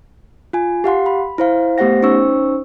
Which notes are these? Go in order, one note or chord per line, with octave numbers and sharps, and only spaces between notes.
F4 G#5
G4 F5 F#5 C6
B5
E4 C5 F5
A3 B3 G4 C5 F#5 A#6
C#4 D#4 C5 C#6 E6